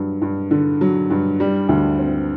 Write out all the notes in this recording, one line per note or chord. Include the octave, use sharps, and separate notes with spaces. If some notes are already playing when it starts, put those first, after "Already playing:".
Already playing: G2 F#3
G2
D3
F#3
G2
G3
D2
C4